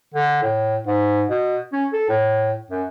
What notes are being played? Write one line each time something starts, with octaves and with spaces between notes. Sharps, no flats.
D3
A2
G#2
B2
C#4
A4
A2
F#2